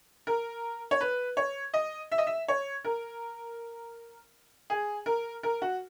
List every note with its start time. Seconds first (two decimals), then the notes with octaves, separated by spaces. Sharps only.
0.27 A#4
0.91 C#5
1.01 B4
1.37 C#5
1.74 D#5
2.12 E5
2.18 D#5
2.27 E5
2.48 C#5
2.85 A#4
4.70 G#4
5.06 A#4
5.43 A#4
5.62 F#4